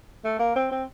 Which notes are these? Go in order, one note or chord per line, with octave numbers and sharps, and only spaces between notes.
A3
A#3
C4
C4